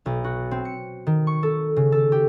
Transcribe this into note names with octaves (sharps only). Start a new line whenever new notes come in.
B1
F#4
C4
C#7
D#3
C#6
A4
C#3
A4
G4